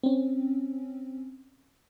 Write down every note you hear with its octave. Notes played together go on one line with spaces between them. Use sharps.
C4 C#4